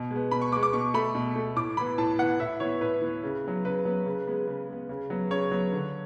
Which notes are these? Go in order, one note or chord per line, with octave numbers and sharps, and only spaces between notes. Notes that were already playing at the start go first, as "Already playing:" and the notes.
Already playing: B2
G#3 B3
B2 B5
C#6
G#3 B3 D6
D6
B2 C#6
A3 B5
B2
A3
A2 D6
E3 B3 B5
A2 A5
E3 B3 F#5
A2 E5
E3 B3 C#5
A2 B4
E3 B3
C#3
F#3 B3
C#3 B4
F#3 B3
C#3
G#3 B3
C#3
G#3 B3
C#3
F#3 B3
C#3 C#5
F#3 B3
D3